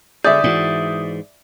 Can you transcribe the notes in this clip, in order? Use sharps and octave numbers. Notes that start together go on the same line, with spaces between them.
D3 G#4 D5 E5 D#6 G6
G#2 E3 F#4